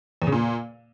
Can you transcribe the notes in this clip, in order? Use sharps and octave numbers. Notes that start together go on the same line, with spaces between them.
E2
C#3
A#2